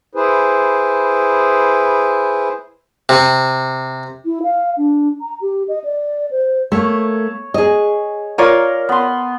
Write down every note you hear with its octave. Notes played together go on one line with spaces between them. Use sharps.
E4 G#4 B4 C5
C3
E4
F5
D4
A#5
G4
D#5
D5
C5
A3 A#3 C#5
G#4 D#5
F4 A#4 C#5 D5
B3 C6